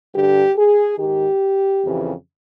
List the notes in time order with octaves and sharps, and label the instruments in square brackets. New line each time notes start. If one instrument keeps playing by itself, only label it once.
[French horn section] G2 D3 G4
G#4
G#2 D#3 G4
F2 C#3 E3